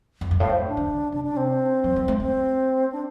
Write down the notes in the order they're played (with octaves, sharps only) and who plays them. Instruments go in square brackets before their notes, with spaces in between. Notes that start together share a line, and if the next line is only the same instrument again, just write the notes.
[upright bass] F2
G2
[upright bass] A2 [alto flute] F5
[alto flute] C5
D4
[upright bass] D3
[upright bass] C3 [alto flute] D4
[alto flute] D4
C4
[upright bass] F3
G3
A3
[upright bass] A3 [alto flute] C4
[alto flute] D4